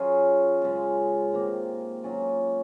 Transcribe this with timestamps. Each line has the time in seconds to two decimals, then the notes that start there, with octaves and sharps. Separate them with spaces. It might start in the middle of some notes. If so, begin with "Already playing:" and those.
Already playing: F#3 C#4 F4 G#4
0.62 C#3 G#3 C#4 F4
1.32 C3 D#3 A#3
2.03 F#3 C#4 F4